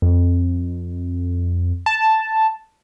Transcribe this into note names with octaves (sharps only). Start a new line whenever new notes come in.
F2
A5